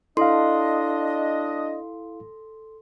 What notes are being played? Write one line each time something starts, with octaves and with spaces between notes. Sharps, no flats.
D4 E4 A4 D#5 F5 C6